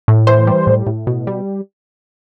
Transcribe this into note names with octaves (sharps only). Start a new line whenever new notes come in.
A2
E3 C5
G3
A2
A2
B2
G3